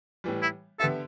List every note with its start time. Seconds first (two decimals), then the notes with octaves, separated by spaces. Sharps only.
0.24 A2 E3 G3
0.42 E4
0.80 D3 B3 G4 A4 E5